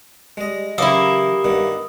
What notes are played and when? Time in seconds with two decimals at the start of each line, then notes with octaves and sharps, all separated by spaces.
0.37 G3 G#3 D#5
0.78 C#3 E3 F#3 A#3 E4 G4 D#6 E6
1.44 G2 D#3 B3